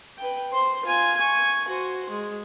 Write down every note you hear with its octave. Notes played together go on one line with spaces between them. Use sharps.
B4 G5
C5 C6
F4 G#5
G#5 C#6
F#4 C5
G#3